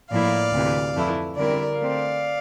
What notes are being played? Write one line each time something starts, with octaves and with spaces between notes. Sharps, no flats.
A2 F3 A#3 E4 D5 F5
D2 C3 E3
F2 E3 A3 E4
D3 G3 C4 E4 A#4 D5
D3 A3 C4 D5 F5